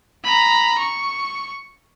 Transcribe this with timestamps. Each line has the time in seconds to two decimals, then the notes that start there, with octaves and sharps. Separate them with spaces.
0.24 A#5 B5
0.79 C#6